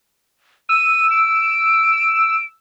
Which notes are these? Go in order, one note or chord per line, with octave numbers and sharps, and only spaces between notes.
E6 D#7
D7